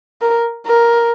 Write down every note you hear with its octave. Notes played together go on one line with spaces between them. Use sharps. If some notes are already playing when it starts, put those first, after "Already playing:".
A#4
A#4